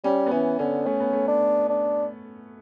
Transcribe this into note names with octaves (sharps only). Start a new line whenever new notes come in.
G3 C#4
B3
E3 C#4
D3 C#4
A3 C#4
B3
A3
D4
D4